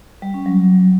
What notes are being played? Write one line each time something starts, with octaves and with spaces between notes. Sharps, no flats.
G3
C#4
F#3